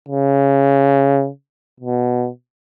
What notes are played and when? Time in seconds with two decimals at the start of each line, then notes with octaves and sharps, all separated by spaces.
0.08 C#3
1.80 B2